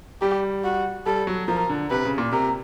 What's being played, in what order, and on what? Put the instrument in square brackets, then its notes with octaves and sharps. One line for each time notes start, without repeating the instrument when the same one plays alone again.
[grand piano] G3 [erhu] G4
[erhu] F#4
[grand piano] G3 [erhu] A4
[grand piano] F#3
[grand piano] F3 [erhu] A#4
[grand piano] D3
[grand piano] C3 [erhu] B4
[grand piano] C#3
A#2
[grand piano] C3 [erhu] A#4